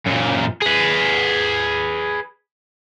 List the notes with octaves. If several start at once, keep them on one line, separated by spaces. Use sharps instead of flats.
F#2 A#2
G#4 B4